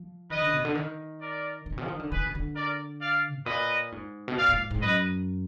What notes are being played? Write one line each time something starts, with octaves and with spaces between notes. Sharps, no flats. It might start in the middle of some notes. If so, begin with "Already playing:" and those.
Already playing: F3
D#3 B4 D#5
D3
B2
D3
D#3
A#4 D5
D#3
A#2
B2
F3
D#3
D3
D#3 G#4 B4
D3
B2
D3
A#4 D5
D5 F5
G#2
A#2 B4 D#5
G#2
B2
A#2 D5 F5
G#2
G#2
F#2 B4 D#5